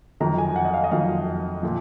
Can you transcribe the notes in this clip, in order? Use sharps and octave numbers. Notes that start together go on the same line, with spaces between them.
F2 D#3 F#3 A#5
G#5
F#5
D#5
F5
D#5
F2 D#3 F#3 F5
A#2 F3